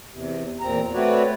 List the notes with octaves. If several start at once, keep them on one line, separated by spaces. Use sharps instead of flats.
E2 C3
E2 A#2 C4 A#5
A3 C4 F#4 B4 C#5 D5